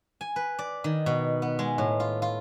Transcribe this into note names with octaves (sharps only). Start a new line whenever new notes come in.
G#5
B4
D5
D#3
B2
B3
G#3
A2
F4
F4